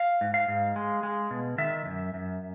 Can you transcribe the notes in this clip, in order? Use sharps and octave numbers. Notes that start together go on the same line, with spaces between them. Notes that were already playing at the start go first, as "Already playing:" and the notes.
Already playing: F5
G#2
F5
G#2
G#3
G#3
B2
D#3 E5
F#2
F#2